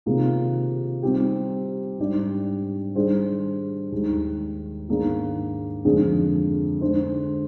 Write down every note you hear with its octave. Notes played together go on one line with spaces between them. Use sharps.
C3 D#3 A#3 F4 G#4
G3 C4 D#4 G4
G#2 G3 D4 G4 D5
D#3 G3 D4 G#4 C5
D#2 D#3 G#3
G#2 D#3 A#3 D4 G#4
F2 D3 G#3 D4 G#4
D3 G#3 D4 G#4 C5